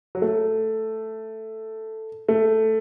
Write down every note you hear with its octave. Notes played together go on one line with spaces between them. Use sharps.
F#3
A3
A3